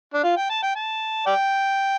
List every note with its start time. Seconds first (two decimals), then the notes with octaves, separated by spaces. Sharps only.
0.14 D4
0.23 F4
0.37 G5
0.50 A5
0.63 G5
0.76 A5
1.26 D5 G5